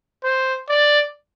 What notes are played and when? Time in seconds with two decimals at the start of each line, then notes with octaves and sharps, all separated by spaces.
0.24 C5
0.69 D5